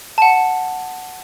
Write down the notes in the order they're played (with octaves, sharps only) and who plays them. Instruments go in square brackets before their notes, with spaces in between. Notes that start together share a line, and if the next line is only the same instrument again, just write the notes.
[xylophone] F#5 A5